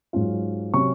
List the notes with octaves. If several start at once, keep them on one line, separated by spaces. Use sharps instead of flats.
G#2 F#3 C#4 F4
C3 F#3 C#4 C#6